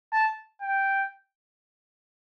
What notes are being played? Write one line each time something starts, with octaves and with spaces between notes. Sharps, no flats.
A5
G5